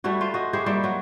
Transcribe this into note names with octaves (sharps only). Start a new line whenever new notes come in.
G3 A3 E4 F#4
F4 C5
F#4 D#5
E4 G4 G#4 C5
G3 A#3 C4 E4
F#3 F#4